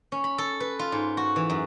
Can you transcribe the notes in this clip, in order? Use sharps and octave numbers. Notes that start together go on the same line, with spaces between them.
C#4
B5
A4
B4
F4
G#2
F#4
E3
F#2